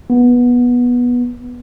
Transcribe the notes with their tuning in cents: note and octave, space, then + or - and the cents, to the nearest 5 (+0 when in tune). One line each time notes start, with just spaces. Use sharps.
B3 -15